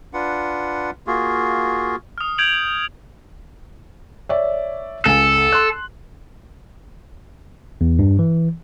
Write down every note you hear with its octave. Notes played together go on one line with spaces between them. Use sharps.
D4 F4 B4 F#5
A#3 F4 F#4 G#4
D#6 F6
G6 G#6 D7 F7 F#7
C#5 D5 E5
C#2 A4 G#5
C6 F#6
E2
G2
E3